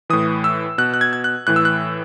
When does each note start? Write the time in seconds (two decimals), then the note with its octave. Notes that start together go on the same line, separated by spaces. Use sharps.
0.10 A2 E3 D#6
0.44 E6
0.78 B2 F#6
0.94 F#6
1.01 G#6
1.13 G#6
1.24 F#6
1.47 A2 E3 F#6
1.56 E6
1.65 F#6